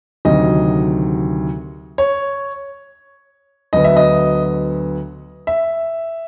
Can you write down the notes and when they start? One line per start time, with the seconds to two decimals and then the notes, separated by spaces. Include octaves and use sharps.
0.25 D2 C3 D#3 F#3 D#5
1.98 C#5
3.73 D2 D3 F#3 B3 D#5
3.84 E5
3.96 D#5
5.47 E5